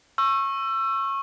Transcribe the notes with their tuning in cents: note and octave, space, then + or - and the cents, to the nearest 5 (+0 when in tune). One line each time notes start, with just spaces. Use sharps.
C#6 -20 E6 +25